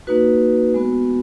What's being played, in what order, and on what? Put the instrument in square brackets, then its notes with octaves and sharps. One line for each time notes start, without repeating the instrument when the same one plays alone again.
[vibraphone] A#3 D#4 F#4 B4
G#3 B3 F#4